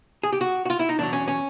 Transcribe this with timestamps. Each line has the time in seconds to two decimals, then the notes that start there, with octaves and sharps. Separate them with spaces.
0.23 G#4
0.33 G4
0.41 F#4
0.65 F#4
0.70 F4
0.79 E4
0.89 D#4
0.98 E2 B2 F#3 D4
1.13 C#4
1.28 C#4